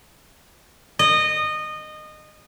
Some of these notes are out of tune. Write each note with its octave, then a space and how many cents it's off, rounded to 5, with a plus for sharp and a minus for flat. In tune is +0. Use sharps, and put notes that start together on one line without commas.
D#5 -20